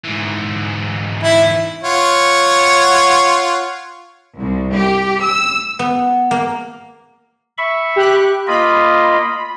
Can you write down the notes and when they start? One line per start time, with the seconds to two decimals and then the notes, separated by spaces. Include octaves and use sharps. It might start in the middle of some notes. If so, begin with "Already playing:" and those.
0.05 G#2 E3
1.23 E4
1.84 F4 C#5 F#5
4.39 C2
4.74 G4
5.22 E6
5.79 B3
6.31 A#3
7.58 E5 B5 C#6
7.96 G4 F#6
8.47 A#3 F4 D#5 B5